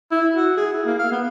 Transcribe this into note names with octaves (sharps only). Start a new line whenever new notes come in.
E4
F#4
G#4
E4
A#3
F5
B3